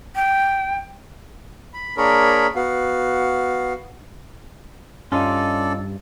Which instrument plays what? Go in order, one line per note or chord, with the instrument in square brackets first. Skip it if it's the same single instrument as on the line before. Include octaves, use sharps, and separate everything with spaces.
[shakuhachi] G5
[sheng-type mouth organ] B5
A#3 D4 G#4 A#4 C#5 B5
B3 F#4 F5
[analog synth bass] G2 [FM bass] C#4 [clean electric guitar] D#4 F4 [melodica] A4 D5